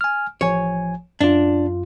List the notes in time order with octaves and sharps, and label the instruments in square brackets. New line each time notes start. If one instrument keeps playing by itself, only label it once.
[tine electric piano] G#5 F6
[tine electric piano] A1 F3 G#5 [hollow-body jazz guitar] C#5
[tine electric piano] F#2 F4 [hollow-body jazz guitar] D4